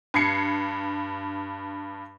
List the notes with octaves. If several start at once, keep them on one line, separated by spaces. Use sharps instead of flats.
G2 G#6 C7 C#7